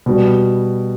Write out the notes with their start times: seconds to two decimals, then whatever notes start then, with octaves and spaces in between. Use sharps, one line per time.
0.06 B2 G3 B4